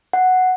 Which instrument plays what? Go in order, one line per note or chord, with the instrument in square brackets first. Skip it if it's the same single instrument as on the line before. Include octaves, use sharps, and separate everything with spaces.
[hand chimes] F#5